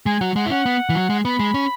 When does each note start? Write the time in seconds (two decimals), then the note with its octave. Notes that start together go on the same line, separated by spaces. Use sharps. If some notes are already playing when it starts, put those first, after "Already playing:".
0.06 G#3 G#5
0.21 F#3 F#5
0.36 G#3 F#5
0.46 E4
0.50 C#4 F#5
0.66 B3
0.89 E3
0.95 F#3
1.10 G#3
1.25 B3 B5
1.39 G#3
1.54 C#4